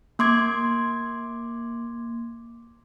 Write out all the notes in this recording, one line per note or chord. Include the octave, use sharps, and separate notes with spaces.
A#3 C6 D6 G#6